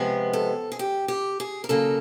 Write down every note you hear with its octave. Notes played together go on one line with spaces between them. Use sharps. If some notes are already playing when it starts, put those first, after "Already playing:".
Already playing: C3 F3 G#3 B3 G#4
A4
G#4
G4
G4
G#4
A#4
C#3 F#3 A#3 A4